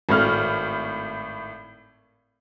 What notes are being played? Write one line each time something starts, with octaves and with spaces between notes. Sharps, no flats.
G#1 A2 F6